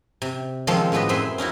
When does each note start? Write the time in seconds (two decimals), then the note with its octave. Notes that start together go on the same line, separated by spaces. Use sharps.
0.22 C3
0.67 D#3 F3 G#3 C4 C#4 A4
0.92 A2 G#3 B3 G4 B4 D#5
1.09 F#2 C4 B4 C5 E5 G#5
1.38 C#4 D#4 E4 F#4